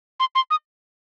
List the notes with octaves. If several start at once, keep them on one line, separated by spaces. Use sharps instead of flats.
C6
C6
D#6